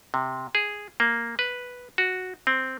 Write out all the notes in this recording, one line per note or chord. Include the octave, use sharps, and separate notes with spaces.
C3
G#4
A#3
B4
F#4
C4